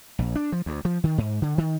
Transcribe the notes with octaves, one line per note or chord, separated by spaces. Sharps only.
A#1
D4
F3
D2
F3
D#3
G#2
D3
D#3